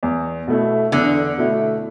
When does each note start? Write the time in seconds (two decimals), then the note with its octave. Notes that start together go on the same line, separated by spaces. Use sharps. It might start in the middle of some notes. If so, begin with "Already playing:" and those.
0.03 E2
0.47 B2 A3 E4
0.92 E2 D3
1.38 B2 A3 E4